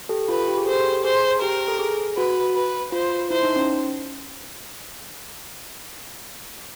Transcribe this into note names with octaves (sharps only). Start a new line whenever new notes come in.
G4 A4
F4 B4
G4
G#4
G4 A4 C5
G#4 C5
G4 A#4
A4
G#4
F#4 B4
B4
F4 C5
E4 C5
D#4
C#4